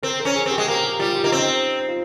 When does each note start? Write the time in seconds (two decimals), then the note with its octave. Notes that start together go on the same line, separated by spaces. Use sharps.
0.03 C4 A#4
0.20 A#4
0.25 C#4
0.35 G#4
0.46 C4
0.51 G4
0.58 G#3
0.67 A#3 A#4
0.84 G4
0.99 G3 F4
1.15 F4
1.24 A#3 D#4
1.32 C4 C#4
1.38 D#4
1.88 F4